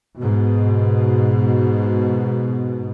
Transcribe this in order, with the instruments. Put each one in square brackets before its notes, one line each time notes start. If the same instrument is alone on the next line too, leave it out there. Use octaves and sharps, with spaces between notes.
[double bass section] G#2 B2